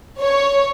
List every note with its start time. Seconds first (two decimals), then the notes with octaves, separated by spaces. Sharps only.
0.21 C#5